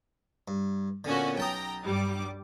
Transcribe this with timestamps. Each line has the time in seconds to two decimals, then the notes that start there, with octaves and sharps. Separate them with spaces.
0.48 G2
1.04 A#2 D3 B3 C#4 F#4
1.37 B1 G5 A5 A#5 D#6
1.86 G2 G3 D6